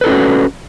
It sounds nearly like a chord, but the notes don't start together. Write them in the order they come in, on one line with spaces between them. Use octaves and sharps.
B4 A4 E4 C#4 F#4